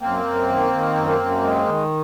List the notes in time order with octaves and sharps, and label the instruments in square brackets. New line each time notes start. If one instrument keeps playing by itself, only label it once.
[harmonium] F#2 [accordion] A#3 C4
[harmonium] F#2
D#3
D#3
F#2
F#2
G#3
D#3